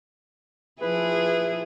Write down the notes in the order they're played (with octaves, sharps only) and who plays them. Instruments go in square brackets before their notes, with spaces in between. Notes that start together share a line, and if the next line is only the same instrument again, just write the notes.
[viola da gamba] F3 E4 G#4 [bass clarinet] B4